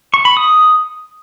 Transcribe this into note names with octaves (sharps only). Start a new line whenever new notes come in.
C#6
B5
D#6